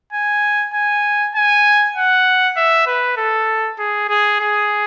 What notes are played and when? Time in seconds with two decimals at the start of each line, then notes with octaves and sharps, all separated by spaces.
0.13 G#5
0.74 G#5
1.35 G#5
1.96 F#5
2.57 E5
2.86 B4
3.17 A4
3.79 G#4
4.09 G#4
4.40 G#4